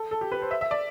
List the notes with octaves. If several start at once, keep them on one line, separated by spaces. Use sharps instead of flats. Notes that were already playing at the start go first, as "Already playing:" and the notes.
Already playing: A4
A4
G4
B4
C5
E5
E5
D5